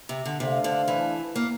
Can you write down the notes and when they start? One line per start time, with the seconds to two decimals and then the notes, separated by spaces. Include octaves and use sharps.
0.09 C3
0.25 D3
0.40 C3 A3 D4 A4 C5 F5
0.64 D3
0.88 E3
1.36 A#3